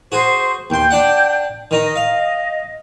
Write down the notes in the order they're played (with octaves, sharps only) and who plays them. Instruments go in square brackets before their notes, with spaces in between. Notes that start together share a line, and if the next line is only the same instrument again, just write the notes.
[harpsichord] F#4 G#4 [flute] C5
[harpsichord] D#2 C6 [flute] G5
[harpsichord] D4 D5 F#5
[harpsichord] D#3 D#4 [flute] D#5
[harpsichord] F5